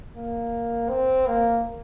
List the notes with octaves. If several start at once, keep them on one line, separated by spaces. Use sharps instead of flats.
A#3
C4
A#3